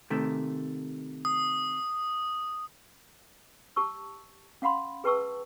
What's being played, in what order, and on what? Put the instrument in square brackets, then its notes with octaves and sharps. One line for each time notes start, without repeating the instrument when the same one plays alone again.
[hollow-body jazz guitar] C3 D#3 A3
[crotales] D#6
[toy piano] G4 A5 C#6 E6
C#4 F5 F#5 B5 C6
G#4 B4 G5 A5 C#6 E6